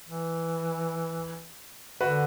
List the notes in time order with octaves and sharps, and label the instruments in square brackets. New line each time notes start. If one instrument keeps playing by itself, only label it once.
[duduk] E3
[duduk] D3 [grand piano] F#4 B4